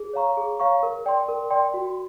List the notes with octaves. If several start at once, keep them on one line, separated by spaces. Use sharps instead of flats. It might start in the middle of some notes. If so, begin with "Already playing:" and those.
Already playing: G#4
C#5 F5 A#5 C#6
G#4
C#5 F5 A#5 C#6
A#4
D5 G5 C6
A#4
D5 G5 C6
F#4